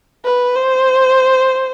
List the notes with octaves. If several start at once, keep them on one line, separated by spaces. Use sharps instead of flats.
B4
C5